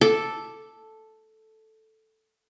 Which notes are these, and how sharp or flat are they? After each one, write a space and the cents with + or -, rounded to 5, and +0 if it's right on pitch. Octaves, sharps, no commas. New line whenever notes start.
A4 +0 D6 +0